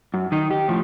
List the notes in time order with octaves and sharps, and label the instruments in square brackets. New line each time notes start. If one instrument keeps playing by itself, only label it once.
[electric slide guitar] F#2
D#3 D#4
G4
A2 F3